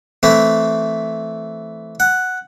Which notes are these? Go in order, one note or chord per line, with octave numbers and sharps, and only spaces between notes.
E3 A3 C4 E4
F#5